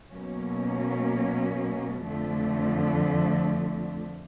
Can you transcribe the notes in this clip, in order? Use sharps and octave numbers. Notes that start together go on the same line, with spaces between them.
B2 F#3 A#3 C#4
F2 D3 F3 A3